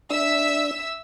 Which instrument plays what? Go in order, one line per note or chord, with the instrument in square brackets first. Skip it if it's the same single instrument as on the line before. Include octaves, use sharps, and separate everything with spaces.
[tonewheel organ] D4 [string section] E5 E6